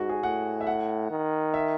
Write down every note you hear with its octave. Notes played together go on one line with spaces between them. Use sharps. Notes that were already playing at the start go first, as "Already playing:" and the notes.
Already playing: G#2 F#4
G#4
A2 F#5
E5
F#5
D#3
E5